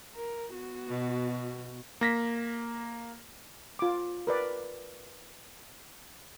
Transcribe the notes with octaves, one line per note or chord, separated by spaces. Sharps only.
A#4
B3 F#4
B2
A#3 A#6 B6
F4 D6
A#4 B4 D5